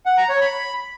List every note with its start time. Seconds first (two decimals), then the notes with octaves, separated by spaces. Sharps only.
0.06 F#5
0.18 A#5
0.29 C#5
0.41 B5